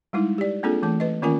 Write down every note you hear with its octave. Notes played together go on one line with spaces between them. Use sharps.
G3 G#3 D#4 E4
G4 D5
A#3 C4 D4 F4 G#4 A4
E3 A3 A5
B4 D#5
D#3 A#3 C#4 F4 A#4 G#5